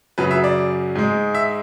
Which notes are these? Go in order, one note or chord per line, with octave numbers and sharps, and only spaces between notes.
F#2 C#3 F#3 B4
E5
D5
G#2 G#3
E5